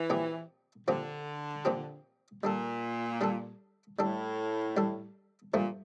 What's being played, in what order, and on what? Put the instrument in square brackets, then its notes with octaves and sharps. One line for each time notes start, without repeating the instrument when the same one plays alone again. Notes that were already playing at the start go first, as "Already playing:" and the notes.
Already playing: [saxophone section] E3
[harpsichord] A#2 F3 C4 G4
[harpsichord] A#2 F3 C4 G4 [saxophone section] D3
[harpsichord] A#2 F3 C4 G4
[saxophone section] A#2 [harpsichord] G3 D4 A4
[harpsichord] G3 D4 A4
[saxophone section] A2 [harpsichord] G3 D4 A4
[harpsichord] G3 D4 A4
[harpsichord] G2 F3 A3 [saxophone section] A#2